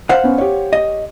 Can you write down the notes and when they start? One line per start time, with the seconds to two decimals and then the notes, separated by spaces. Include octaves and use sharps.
0.09 C5 F5 F#5
0.23 B3 C#4
0.38 G4 C#5
0.73 D#5